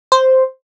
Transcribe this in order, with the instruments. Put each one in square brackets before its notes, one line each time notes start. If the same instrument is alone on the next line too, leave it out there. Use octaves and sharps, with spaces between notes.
[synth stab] C5